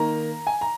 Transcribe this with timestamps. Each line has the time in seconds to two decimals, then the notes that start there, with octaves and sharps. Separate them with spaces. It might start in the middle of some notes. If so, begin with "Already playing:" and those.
Already playing: D#3 A#3 A#5
0.47 G#5
0.61 A#5